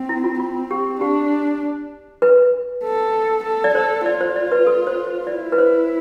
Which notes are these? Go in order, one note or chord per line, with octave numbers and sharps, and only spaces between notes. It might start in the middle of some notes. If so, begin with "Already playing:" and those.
Already playing: C4
E4
F4
C4 F4
G4
D4 G4
B4
A4
A4
D5
A4 C5
F4 D5
C5
D5
B4
A4
C5
C5
E4 D5
B4
C5